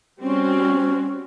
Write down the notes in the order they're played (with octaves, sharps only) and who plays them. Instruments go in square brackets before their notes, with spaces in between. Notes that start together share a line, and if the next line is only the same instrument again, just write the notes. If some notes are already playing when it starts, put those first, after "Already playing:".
[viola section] G3 C4 F#4 [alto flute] C#4